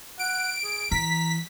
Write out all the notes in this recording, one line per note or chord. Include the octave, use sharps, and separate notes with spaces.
F#5 D7
G#4
E3 A#5 B6